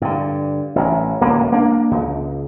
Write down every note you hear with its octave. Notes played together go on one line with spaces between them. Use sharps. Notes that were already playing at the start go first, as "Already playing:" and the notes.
G2 D3
A1 A2
D1 C#2 C3 A#3
A#3 D4
C#2